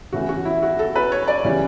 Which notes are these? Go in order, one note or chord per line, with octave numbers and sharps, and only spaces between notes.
C#3 E3 A3 F#4
F#4
E4
F#4
A4
B4
C#5
D5
C#3 E3 G3